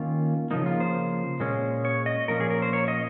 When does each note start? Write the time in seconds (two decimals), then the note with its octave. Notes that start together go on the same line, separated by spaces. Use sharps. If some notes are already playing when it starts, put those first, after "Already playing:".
Already playing: D#3 A#3 C#4 F4
0.51 C#3 F3 A#3 D#4
0.66 F4
0.80 C5
1.40 A#2 G#3 C#4
1.85 C#5
2.06 D#5
2.28 A#2 F3 A#3 C#4 A#4
2.40 G#4
2.50 A#4
2.62 C5
2.73 C#5
2.88 D#5